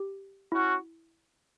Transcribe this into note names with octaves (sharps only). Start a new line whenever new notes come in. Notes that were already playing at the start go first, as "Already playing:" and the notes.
Already playing: G4
C#4 E4 F#4